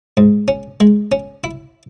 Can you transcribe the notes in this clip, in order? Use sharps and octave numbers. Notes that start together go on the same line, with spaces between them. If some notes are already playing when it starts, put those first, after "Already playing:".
G#2
C#4
G#3
C#4
E4